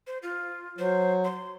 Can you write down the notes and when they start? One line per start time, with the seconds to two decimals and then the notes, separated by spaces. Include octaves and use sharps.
0.07 C5
0.22 F4
0.78 F#3 C5
1.24 C6